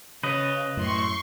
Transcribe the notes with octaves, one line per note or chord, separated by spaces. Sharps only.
C#3 B4 C#5 D#5
F#2 A2 C6 C#6